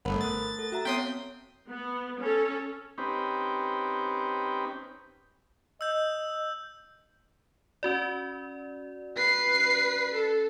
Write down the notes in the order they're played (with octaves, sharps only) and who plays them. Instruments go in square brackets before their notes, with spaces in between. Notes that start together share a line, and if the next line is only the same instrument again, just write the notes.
[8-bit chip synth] G1 [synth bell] A3 F#5 [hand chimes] A#4 C5 B5
[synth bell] D#6 F#6 [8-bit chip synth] A6
[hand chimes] A4
[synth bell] F#4 E5 A#5
[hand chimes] B3 C4 C#5 [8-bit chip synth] G5 C6 D#6 [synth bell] B6
[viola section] B3
C#4 A4
[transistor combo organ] C4 C#4 D#4 G4 B4
[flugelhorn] D#5 [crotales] E6 G6
[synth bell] C#4 F#4 D5
[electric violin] B4 C7
A4